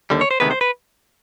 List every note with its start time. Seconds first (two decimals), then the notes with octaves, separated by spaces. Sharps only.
0.10 D#2 D3 G3
0.21 C#5
0.31 C5
0.40 D2 C3 D#3 G#3 B3 B4
0.51 C5
0.61 B4